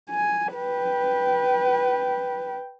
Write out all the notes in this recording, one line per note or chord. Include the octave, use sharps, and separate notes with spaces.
G#5
B4 G5